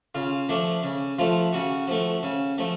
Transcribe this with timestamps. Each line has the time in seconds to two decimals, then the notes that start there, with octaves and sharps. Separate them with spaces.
0.15 C#3 F4
0.49 F3 A3 D4
0.83 C#3
1.19 F3 A3 F4
1.53 C#3 F#4
1.88 F3 A3
2.23 C#3
2.58 F3 A3